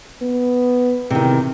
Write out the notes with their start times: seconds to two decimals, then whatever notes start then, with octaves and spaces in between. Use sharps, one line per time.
0.22 B3
1.10 E2 C3 D#3